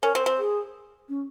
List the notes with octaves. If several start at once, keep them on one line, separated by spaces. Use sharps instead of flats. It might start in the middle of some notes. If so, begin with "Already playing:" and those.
C#4 A#4
C4
C4
G#4
C#4